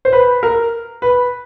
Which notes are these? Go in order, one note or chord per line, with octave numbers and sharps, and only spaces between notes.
C5
B4
A#4
B4